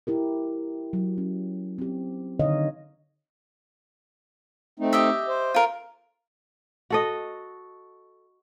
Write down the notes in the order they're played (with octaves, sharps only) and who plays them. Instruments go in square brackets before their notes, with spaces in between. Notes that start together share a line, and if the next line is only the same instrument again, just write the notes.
[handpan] E4 G4 A#4
F#3
C#4
C4 G4
D3 D#3 C#5 D#5 F5
[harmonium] A3 C4 D#4
[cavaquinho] G4 D#5 E5
[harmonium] C5
[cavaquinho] F4 A#4
[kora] F#4 A4 D#5